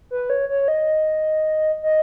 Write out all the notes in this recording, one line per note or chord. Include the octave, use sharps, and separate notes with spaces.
B4
C#5
C#5
D#5
D#5